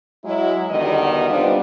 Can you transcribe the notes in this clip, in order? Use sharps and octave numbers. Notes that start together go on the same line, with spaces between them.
F#3 G#3 E4
E2 B2 D3 D#3 G3 D#5
G3 B3 C4 D4 F4